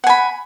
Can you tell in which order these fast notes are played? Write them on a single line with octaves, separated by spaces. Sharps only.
F#5 G#5 B5